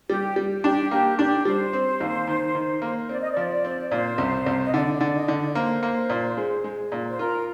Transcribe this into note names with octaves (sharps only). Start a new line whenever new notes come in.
G3 G4
G3
D4 G4
A#3 G4
D4 G4
G3 C5
C4
D#2
D#3
D#3
A#3
C4 D5
D#5
D5
F3
C4
A#2 C5
C2
C2
D#5
D3 D5
D5
D3
D#5
D3
D5
A#3 C5
A#3
A#2
G#3
G#3
A#2
C5
F4 A#4